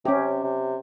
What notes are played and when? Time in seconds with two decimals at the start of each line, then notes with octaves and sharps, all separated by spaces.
0.05 C3 C#4 G4
0.44 C3